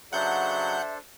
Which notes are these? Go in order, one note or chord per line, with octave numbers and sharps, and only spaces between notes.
C#3 F#3 D4 A4 C5 E5 F#5 G6